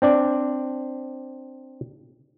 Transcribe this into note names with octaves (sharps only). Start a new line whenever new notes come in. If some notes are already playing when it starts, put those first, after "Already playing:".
C4 D4 D5